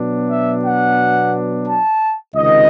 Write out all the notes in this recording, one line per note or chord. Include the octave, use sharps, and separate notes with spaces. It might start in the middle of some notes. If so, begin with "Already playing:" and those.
Already playing: B2 F#3 B3 D4
E5
F#5
A5
C#2 C3 D#3 D#5